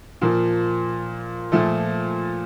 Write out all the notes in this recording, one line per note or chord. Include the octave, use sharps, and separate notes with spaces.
A#2 F3 A#3
A#2 F3 A3